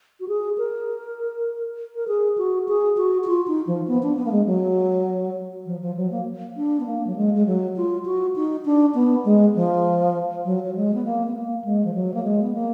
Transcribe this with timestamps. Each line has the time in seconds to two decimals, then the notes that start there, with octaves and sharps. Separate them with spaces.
0.20 F#4
0.28 G#4
0.58 A#4
1.95 A#4
2.08 G#4
2.38 F#4
2.68 G#4
2.97 F#4
3.24 F#4
3.27 F4
3.48 D#4
3.67 F3
3.88 B3
4.03 D4
4.17 B3
4.26 A#3
4.32 G#3
4.46 F#3
5.66 F3
5.81 F3
5.97 F#3
6.11 A#3
6.57 D4
6.80 B3
6.86 A#3
7.07 F#3
7.16 G#3
7.35 G#3
7.46 F#3
7.76 F4
8.06 F#4
8.36 D#4
8.65 D4
8.95 B3
9.25 G#3
9.55 F3
10.45 F#3
10.64 F#3
10.75 G#3
10.94 B3
11.05 A#3
11.27 B3
11.34 A#3
11.65 G#3
11.85 F3
11.95 F#3
12.14 A#3
12.24 G#3
12.43 B3
12.54 A#3